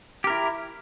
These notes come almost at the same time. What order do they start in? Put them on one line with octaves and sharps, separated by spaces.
G4 A#4 E4